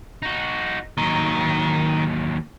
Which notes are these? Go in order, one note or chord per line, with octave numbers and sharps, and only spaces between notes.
D#4 F#4
D#2 D#3 F#3